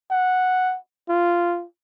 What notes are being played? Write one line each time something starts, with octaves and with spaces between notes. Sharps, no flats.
F#5
F4